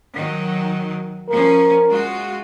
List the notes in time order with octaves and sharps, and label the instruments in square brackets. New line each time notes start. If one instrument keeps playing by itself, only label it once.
[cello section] D#3 F#3
[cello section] F3 C#4 [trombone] A#4
[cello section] G#3 F4 F#4